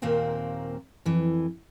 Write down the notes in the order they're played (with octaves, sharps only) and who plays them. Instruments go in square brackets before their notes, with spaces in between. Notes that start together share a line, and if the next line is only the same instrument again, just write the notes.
[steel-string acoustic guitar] D#2 A#2 A#3 C4 A#4
F2 E3